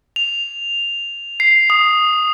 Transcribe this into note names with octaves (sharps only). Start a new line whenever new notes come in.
F7
C7
D#6